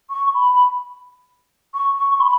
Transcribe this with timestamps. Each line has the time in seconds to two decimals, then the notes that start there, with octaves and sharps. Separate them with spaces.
0.10 C#6
0.34 B5
0.49 B5
1.74 C#6
1.97 C#6
2.15 C#6
2.20 B5